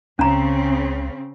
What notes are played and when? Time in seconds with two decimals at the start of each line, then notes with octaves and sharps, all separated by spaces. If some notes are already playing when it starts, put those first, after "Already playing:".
0.19 C#2 C#3 C4 C#4 A#5